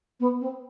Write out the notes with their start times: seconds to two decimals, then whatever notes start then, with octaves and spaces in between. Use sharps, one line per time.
0.20 B3
0.40 C4